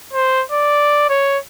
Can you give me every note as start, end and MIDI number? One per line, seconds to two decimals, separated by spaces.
0.13 0.44 72
0.52 1.06 74
1.09 1.38 73